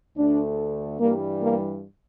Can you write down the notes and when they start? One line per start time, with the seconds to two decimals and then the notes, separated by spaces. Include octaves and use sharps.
0.16 D2 D3 A3 D4
1.00 G2 E3 G3 A#3
1.42 A#3